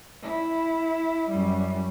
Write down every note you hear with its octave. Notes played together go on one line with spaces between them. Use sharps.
E4
F#2 G3